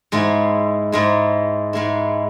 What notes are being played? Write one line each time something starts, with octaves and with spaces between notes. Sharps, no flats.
G#2 G#3 E4
G#2 G#3 E4
G#2 G#3 E4